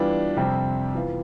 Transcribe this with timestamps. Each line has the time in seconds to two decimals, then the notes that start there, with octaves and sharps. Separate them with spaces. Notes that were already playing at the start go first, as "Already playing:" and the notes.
Already playing: E3 G3 B3 D4 F4
0.37 F2 C3 G3 C4
0.95 E3 B3 F4